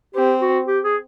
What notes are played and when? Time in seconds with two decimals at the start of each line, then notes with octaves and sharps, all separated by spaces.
0.15 C4 G4
0.41 F#4
0.67 G4
0.84 G#4